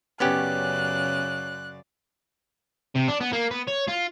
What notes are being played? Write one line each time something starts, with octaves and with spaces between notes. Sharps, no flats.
F#2 C#3 B3 C#4 G4 D5 F#6
C3
D4
B3
A#3
B3
C#5
F4